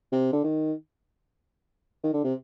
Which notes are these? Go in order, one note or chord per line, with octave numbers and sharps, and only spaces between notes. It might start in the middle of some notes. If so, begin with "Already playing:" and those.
C3
D3
D#3
D#3
D3
C3